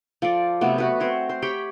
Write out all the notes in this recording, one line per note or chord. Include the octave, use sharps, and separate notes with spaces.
F3 F4 A4 D5
C3 F#3 A3 B3
F#4 B4
C4 C5 C#5
C5
G4 C#5 G5 B5